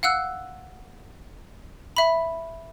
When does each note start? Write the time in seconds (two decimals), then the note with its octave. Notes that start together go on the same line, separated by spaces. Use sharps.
0.03 F5 F#5 E6 F#6
1.97 E5 B5